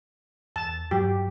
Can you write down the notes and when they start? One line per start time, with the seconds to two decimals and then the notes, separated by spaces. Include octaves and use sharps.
0.56 E2 A5
0.91 G2 F#3 G4